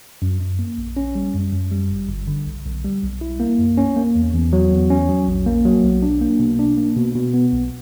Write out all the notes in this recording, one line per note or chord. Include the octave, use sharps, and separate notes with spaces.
F#2
F#2
A#3
A#1
C#4
G3
F#2
F#2
G3
G1
G1
D3
B1
B1
G3
B1
E4
A#3
F#2
C#4
A#3
E2
E2
F#3
E2
C#4
F#3
A#1
A#3
F#3
B1
D4
A#3
B2
D4
A#3
B2
B2
B3
B1